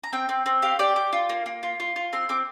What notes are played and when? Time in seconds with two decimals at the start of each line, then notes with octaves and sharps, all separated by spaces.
0.04 A#5
0.13 C4 G5
0.29 C4
0.46 C4
0.62 G4 F5
0.79 G4 D5
0.96 G4 D6
1.13 F4
1.29 A#3
1.46 A#3
1.63 F4
1.80 F4
1.96 F4
2.13 C4 C6
2.29 C4 D6